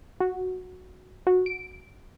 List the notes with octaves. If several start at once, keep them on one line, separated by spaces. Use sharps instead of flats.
F#4
F#4
D7